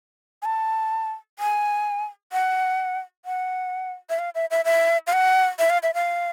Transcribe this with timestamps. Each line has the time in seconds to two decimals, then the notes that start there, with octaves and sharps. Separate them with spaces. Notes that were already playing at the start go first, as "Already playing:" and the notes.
0.42 G#5
0.45 A5
1.39 G#5
2.33 F#5
3.25 F#5
4.10 E5
4.19 F5
4.35 E5
4.51 E5
4.65 E5
5.07 F5
5.13 F#5
5.59 E5
5.70 F5
5.83 E5
5.94 F5